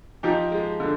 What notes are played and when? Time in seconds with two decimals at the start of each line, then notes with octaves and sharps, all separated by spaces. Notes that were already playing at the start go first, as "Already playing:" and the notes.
0.23 F3 D#4 G4
0.52 G#3
0.80 D3